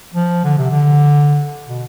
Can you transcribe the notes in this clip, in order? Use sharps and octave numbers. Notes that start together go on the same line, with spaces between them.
F3
D3
C3
D3
B2